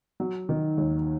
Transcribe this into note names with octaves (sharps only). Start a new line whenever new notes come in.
F#3
D#3
D#2